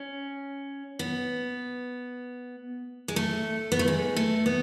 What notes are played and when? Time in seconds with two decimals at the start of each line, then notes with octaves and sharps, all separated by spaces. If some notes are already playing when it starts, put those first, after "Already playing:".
Already playing: C#4
0.99 B3
3.08 G#3
3.16 A3
3.72 B3
3.79 A3
3.88 G#3
4.16 A3
4.46 B3